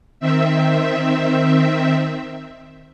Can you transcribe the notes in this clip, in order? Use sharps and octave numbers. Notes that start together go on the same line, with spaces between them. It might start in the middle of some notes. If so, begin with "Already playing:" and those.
D#3 C4 E5